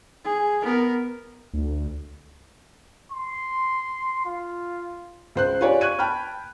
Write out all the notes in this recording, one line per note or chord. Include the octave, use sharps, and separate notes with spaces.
G#4
B3 A#4
D2
C6
F4
C#2 C5 F#6
F4 G4 C#5 D5 G#5
C#6 F#6 G#6 D#7
G5 A5 B5 F6